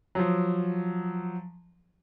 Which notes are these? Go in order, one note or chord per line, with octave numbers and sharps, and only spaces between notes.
F3 F#3